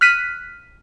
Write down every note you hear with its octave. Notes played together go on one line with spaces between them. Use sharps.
F6 F#6 B6 D#7